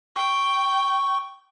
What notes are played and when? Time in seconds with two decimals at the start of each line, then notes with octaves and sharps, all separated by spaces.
0.16 G5 C#6